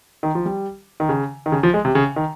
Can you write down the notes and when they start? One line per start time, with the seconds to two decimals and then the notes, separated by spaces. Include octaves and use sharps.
0.23 D#3
0.35 F3
0.46 G3
1.00 D#3
1.09 C#3
1.46 D#3
1.52 C#3
1.63 F3
1.74 G#3
1.85 C3
1.95 C#3
2.16 D#3